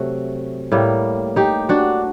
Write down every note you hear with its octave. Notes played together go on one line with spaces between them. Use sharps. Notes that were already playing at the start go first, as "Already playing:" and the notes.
Already playing: C3 F#3 A3 F#4
A2 G3 A#3
D#4 G4
D4 F#4